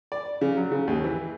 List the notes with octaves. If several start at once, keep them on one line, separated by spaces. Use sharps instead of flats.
D5
C#3
F#3
C#3
D#2
E3